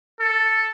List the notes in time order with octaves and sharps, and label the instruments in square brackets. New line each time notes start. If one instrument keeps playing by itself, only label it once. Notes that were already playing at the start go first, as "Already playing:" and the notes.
[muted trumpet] A4